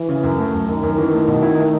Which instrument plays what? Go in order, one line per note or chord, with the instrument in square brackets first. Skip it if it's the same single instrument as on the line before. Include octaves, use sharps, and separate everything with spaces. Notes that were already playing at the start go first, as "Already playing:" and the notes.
Already playing: [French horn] E3
[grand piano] C#3
F#2
A3
F#2
[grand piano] F#2 [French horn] D#3
[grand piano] F#2
E3
A3
B2
E4
A3